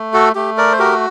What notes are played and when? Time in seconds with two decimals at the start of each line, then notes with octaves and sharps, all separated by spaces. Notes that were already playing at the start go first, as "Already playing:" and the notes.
Already playing: A3
0.14 F#4 A4
0.35 A3 G4
0.57 A#4 D5
0.72 C5
0.79 F#4 G4 A#4